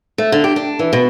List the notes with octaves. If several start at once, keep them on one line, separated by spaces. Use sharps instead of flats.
A3
D3
G4
D4
E3
B2